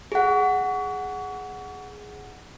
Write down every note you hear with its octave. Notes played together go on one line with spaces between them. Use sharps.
G#4 F#5